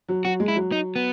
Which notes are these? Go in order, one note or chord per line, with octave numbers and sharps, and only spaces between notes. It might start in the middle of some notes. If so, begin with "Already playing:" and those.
F#3
F#3 F#4
G#3
E4
F#3
D#4
B3